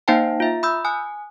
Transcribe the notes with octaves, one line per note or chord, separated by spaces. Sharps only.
A#3 D#4 C5 F5 G5 A5
F4 E5
B5 D#6 E6 G6
G#5 D#6 F#6